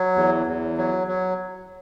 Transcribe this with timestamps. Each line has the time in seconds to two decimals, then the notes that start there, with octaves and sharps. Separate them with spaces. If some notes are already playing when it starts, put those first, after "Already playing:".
Already playing: F#3
0.16 E2
0.47 E2
0.78 F#3
1.07 F#3